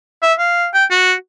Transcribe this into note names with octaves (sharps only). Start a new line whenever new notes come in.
E5
F5
G5
F#4